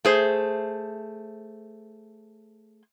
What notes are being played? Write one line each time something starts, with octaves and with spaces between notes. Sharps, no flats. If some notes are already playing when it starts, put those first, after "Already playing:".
A3 G#4 C5